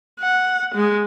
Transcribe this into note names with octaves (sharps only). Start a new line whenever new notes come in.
F#5
G#3